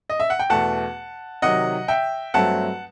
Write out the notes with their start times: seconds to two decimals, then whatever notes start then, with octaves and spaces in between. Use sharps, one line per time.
0.10 D#5
0.20 E5
0.30 F#5
0.39 G5
0.49 E2 B2 A3 F#5 A5
1.42 C3 D#3 F#3 D#5 F#5
1.88 E5 G5
2.34 G2 F#3 A3 C4 F#5 A5